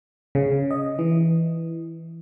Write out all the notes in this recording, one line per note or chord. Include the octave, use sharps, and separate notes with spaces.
C#3
D#5
E3